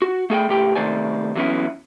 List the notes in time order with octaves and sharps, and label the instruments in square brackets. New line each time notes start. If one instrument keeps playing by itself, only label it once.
[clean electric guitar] F#4
A3 G#4 F#5 G5
C#2 A2 G4 G5
C3 D#3 A3 C5 D5 G#5
E3 F#3 G3 B3 C#4 E4